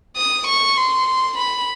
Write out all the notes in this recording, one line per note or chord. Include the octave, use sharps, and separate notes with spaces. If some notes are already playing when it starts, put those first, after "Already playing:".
D#6
C#6
C6
B5